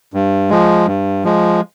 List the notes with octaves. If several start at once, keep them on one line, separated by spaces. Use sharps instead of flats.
G2
F3 G#3
G2
F3 G#3